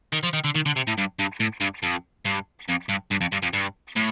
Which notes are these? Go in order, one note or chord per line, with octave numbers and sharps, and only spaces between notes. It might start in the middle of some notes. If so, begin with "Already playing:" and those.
D#3
F3
D#3
D3
D#3
D3
C3
A2
G2
G2
A2
G2
F2
G2
F2
G2
G2
F2
G2
F2
G2
A2